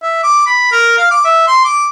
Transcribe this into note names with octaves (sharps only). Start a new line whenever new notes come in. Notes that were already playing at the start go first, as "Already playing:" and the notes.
E5
D6
B5
A#4
F5
D6
E5
C6
D6